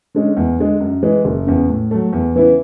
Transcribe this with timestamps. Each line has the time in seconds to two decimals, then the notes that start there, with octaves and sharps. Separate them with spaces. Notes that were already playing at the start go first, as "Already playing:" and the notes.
0.14 D3 G#3 C#4
0.37 E2
0.59 D3 G#3
0.80 F#2
1.03 E3 G#3
1.25 F#1
1.47 E2 C#3
1.69 A2
1.91 F#3 A3
2.13 E2
2.35 C#3 E3 B3 E4